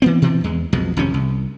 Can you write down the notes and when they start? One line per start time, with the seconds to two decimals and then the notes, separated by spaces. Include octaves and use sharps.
0.02 E3 B3 C4
0.22 B2 E3 F3 C4
0.44 E2 G#3
0.73 B1 F2 B2 G#3
0.97 G#1 F2 C3 C#4
1.14 C2